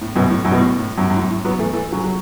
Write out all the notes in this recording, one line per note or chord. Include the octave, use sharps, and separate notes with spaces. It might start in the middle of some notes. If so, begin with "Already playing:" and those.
A2
F#2 B2
A2
F#2
B2
A2
A2
F#2
F#2
A2
A2
F#3 B3
E3 A3
E3 A3
C#3 F#3
F#3